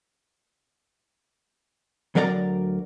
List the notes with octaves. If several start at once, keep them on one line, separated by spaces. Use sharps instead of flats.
D2 F#3 A#4 D5 A#5